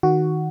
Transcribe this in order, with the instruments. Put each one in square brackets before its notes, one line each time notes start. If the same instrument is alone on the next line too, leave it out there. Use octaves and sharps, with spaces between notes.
[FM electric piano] D#3 F#4